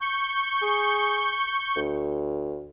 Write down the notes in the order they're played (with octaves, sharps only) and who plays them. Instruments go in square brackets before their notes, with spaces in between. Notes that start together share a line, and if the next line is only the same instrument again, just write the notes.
[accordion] C#6 G6
[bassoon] G#4
D2